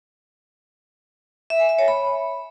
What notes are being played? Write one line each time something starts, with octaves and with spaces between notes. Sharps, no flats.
E5
G#5
E5
C#5
B5